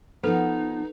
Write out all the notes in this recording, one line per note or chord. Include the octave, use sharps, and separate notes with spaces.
F3 B3 D#4 A4 B4